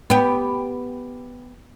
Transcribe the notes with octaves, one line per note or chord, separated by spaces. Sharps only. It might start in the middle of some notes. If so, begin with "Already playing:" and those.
B3 G4